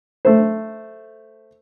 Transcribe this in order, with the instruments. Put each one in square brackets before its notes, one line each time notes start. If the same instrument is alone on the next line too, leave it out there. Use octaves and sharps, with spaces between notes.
[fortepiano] A3 C5